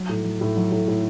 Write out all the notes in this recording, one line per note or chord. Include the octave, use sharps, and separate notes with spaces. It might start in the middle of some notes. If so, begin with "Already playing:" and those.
Already playing: F#3
A2
F#3
A2
F#3
A2
A2